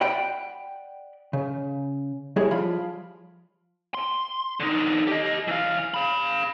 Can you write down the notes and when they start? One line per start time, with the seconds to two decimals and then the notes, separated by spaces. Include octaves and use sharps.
0.01 D5 F#5 G5 B5
1.33 C#3
2.36 G3 E4 G#4 C#5
2.51 F3 F4 B5
3.94 C6
4.60 D3 D#4
5.07 G4 D#5
5.48 E3 F5
5.94 F5 B5